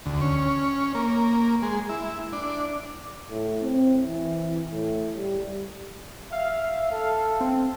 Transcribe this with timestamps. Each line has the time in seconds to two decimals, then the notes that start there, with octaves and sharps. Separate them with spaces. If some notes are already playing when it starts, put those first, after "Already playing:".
0.06 D2
0.21 C#4
0.95 A#3
1.62 G#3
1.89 E4
2.33 D4
3.30 A2
3.62 C4
4.07 E3
4.71 A2
5.16 G3
6.32 E5 F5
6.92 A4
7.40 C4